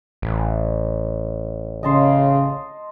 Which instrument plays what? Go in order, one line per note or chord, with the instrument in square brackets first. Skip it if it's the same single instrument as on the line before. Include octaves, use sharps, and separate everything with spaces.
[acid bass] A1
[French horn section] C#3 [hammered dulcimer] D#5 A5 C6